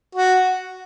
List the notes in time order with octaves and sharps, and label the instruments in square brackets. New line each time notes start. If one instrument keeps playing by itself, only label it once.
[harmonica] F#4